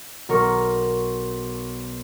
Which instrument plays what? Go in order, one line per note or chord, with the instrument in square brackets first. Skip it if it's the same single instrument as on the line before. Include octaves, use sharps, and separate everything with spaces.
[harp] B1 A#4 C#6